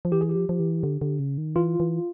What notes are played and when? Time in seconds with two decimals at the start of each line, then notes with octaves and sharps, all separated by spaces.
0.05 F3
0.12 E3 G4
0.21 G#4
0.29 G4
0.36 F3
0.49 F3
0.60 E3
0.83 D3
1.01 D3
1.19 C#3
1.38 D#3
1.56 E3 F4
1.80 E3